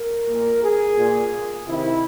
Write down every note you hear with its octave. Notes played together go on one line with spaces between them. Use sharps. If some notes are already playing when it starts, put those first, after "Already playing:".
Already playing: A#4
A#2
G#4
A#2
C3 D#3 E4